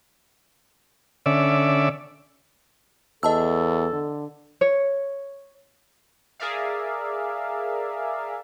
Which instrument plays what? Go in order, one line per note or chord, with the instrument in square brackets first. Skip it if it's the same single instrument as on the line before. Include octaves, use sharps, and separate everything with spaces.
[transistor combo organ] D3 C#4 D5 E5
[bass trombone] E2 [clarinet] A4 [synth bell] D#5 A5 E6
[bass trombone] D3
[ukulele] C#5
[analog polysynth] G#4 A#4 D5 E5 F5